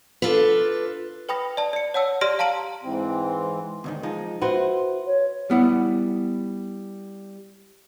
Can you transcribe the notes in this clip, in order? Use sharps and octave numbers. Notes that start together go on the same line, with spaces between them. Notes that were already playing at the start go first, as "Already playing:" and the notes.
D4 F4 A4 B4
B4 G5 B5 D#6 A#6
D5 A5
D5 C#7
C#5 F#5 A5 E6
G4 D5 C6 F6 A#6 D7
F5 A5 A#5 D7 F#7
G#2 E3 C4
D2 G#2 D#3
F3 G#3 D#4
E4 F#4 B4 C5
C#5
G3 B3 E4 F#5